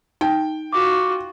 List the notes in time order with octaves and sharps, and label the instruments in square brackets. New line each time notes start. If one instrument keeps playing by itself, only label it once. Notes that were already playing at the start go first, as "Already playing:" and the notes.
[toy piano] D#4 [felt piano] G5
[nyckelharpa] F4 F#4 [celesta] D6